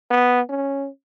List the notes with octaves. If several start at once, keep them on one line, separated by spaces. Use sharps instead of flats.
B3
C#4